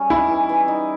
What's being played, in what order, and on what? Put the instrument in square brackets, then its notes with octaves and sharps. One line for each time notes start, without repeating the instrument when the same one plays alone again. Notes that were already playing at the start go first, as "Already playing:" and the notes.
Already playing: [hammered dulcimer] G3 C#4 G#4
[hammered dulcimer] D#4 [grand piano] E4
[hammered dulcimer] E3
E3
D#4